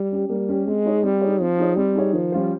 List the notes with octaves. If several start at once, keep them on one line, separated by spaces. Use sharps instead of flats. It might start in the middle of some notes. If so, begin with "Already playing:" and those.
Already playing: G3
C#4 G4
G3 A#3
C#4 G4
G#3 C4
D#4 G#4 C#5
G3 C4
D#4 G#4 C#5
F3 C4
D#4 G#4 C#5
G3 C4
D#4 G#4 C#5
D#3 F3
G3 C#4 F4 C5